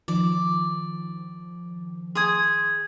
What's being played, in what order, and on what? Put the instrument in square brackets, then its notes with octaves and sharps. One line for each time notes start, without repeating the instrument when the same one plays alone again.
[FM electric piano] D#3 F3 [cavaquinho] D5
[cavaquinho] G#4 D#6 [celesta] C6 G#6